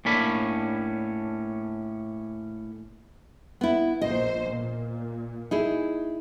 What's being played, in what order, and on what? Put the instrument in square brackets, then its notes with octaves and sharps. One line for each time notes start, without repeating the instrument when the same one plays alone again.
[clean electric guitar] A2 A#3 C#4 D4 B5
[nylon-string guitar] B3 E4
[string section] A#1 C5 [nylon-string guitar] D#5
[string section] A#2
[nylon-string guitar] D#4 E4 G#4